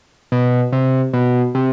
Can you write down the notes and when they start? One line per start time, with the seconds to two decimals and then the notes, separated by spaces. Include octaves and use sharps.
0.32 B2
0.72 C3
1.13 B2
1.55 C3